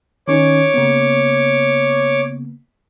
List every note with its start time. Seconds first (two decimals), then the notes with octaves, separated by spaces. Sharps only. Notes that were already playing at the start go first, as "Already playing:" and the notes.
0.28 D#3 C#4 D#4 C#5 D6
0.74 C#3 A#3 B3